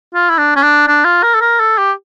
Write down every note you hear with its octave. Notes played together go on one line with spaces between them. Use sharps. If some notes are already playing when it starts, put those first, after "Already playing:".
F4
E4
D4
C#4
D4
D4
F4
A#4
A4
A#4
A4
G4